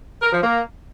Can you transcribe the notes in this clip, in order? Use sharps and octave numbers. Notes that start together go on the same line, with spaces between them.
A#4
F3
A#3